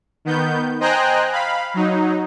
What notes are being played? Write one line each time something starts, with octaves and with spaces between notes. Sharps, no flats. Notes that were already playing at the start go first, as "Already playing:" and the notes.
D#3 B3 G6
C5 D#5 G5 G#5 A#5 F#6
F5 B5
F#3 D#4